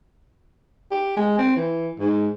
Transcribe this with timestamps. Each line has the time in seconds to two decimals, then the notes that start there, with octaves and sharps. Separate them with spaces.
0.91 G4
1.17 G#3
1.38 C4
1.56 E3
2.00 G#2